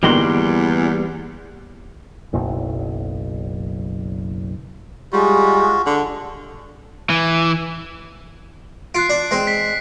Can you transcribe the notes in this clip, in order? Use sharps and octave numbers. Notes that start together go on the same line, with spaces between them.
G1 E2 D#3 G3 A#3 F#4 C6
F#1 B1
G3 G#3 F4 F#4
D3
E3
F4 F#6 C7 D7
D4
G#3 C4
B6